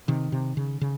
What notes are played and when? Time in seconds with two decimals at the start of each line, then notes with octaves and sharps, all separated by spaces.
0.08 C3 D#3
0.32 C3
0.57 C#3
0.81 C#3